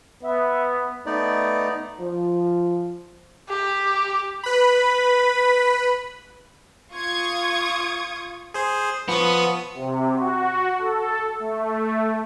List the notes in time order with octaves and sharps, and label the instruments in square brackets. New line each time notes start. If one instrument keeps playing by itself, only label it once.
[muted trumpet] B3 [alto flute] E5
[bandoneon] A3 B3 D#4 D5
[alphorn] F3
[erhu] G4
[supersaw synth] B4 B5
[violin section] F4 C#6 D#6 G#6
[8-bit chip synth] G#4 C5
[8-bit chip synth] F3 C#6 D#6 [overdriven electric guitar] B3
[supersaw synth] C3
F#4
A4
A3